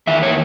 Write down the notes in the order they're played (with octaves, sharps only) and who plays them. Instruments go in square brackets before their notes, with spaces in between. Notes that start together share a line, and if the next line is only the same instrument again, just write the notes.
[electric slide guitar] E2 D#3 E5
C#5